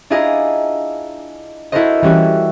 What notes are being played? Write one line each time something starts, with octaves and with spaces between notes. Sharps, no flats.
D4 E4 F4 G#4 D#5 A#5
E4 F#4 A4 A#4 C5 D#5
E3 G3 C#4 F#4